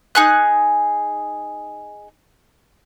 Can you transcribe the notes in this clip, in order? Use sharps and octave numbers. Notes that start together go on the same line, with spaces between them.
D#4 G#4 F#6